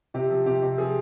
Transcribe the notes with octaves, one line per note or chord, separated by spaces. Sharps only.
C3 G4
F3
C3 G4
C3
F3 G#4